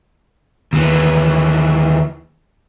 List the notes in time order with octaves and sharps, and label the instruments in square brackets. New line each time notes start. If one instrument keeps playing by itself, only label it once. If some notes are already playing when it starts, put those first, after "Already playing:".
[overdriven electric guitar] D#2 E3